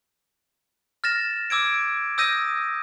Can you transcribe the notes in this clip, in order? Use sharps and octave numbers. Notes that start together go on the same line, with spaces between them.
F6 A6 A#6 E7
D6 E6 G#6 D7
D#6 E6 G6 A#6 D#7